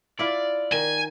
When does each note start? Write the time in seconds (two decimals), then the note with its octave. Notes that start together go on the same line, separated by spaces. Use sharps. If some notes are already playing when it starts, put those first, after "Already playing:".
0.19 E4 F4 D5
0.73 D#3 G#5